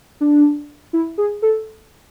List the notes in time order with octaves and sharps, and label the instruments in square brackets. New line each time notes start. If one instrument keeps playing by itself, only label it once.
[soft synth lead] D4
E4
G#4
A4